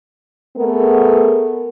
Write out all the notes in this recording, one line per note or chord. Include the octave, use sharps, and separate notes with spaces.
A3 B3 G#4 A#4